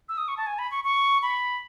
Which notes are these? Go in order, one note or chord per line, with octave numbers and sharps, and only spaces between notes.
E6
D#6
C#6
A5
G#5
B5
C#6
C#6
B5